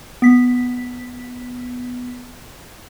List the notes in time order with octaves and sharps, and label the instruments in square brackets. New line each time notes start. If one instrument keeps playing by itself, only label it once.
[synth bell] B3 B6